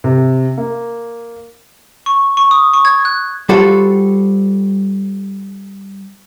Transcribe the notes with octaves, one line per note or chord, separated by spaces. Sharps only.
C3
A#3
C#6
C#6
D#6
C#6
G#6
F#6
G3 F4 F#4 A4 C5